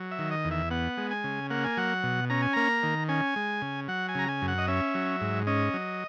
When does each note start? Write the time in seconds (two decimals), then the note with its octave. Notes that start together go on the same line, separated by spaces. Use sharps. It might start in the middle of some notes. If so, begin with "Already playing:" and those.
Already playing: F#3
0.11 E5
0.19 D#3
0.31 D#5
0.45 E2
0.51 E5
0.71 B3 F#5
0.97 G#3
1.11 G#5
1.24 C#3
1.50 A#3 F#5
1.64 G#5
1.77 F#3 F#5
2.03 B2
2.30 C#4 A#5
2.42 G#5
2.53 A#3 A#5
2.83 D#3
3.09 C#4 G#5
3.36 G#3
3.62 C#3
3.88 F#3 F#5
4.09 G#5
4.15 C#3 A#5
4.28 G#5
4.42 F#2
4.48 F#5
4.58 D#5
4.68 C#4 E5
4.95 F#3
5.21 G#2
5.47 C#4 D#5
5.74 F#3